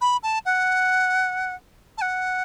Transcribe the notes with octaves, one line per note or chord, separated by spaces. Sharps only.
B5
A5
F#5
A5
F#5